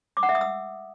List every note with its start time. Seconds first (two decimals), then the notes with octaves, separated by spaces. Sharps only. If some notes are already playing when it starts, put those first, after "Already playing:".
0.17 D6
0.23 F#5
0.29 E5
0.35 D#6
0.41 E6